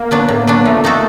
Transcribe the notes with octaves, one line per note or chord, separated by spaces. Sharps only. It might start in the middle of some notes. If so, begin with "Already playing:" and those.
Already playing: A#3
F#3 B3 D4
A2
F#3 B3 D4
F3 A3
A#3 D#4 F#4 A4